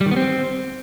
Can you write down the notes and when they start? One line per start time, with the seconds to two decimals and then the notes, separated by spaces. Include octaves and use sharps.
0.01 G3
0.06 D#3
0.11 B3
0.16 C4